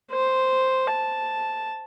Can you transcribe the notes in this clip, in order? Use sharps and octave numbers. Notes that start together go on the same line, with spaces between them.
C5
A5